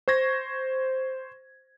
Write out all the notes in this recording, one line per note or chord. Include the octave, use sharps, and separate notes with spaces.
C5 C#6 G#6 A#6